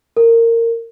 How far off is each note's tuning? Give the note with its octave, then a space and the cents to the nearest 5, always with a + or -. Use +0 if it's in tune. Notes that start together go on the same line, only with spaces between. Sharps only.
A#4 -20